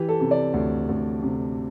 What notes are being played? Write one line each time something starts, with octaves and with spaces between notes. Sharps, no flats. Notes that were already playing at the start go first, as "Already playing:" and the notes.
Already playing: E3 G4
A4
C3
D5
D2
D2
C3